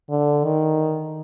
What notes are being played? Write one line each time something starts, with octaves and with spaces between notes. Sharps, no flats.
D3
D#3